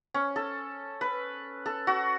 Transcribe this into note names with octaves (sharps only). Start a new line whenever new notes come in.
C#4
A4
B4
A4
F#4